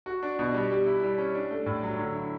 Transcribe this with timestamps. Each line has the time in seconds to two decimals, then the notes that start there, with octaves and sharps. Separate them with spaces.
0.06 F#4
0.23 D4
0.39 B2
0.54 G3
0.71 G4
0.86 E4
1.03 G3
1.18 C#4
1.35 D4
1.51 A3
1.66 A2
1.83 F#3
1.98 D3
2.15 E4